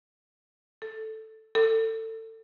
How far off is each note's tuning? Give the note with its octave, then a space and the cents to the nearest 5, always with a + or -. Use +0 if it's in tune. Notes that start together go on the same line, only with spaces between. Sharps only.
A4 +0
A4 +25